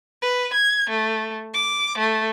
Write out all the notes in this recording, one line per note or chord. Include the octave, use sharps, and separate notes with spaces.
B4
G#6
A3
D6
A3